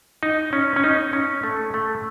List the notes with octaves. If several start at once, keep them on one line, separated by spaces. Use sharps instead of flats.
D#4
C#4
C#4
D#4
C#4
A3
A3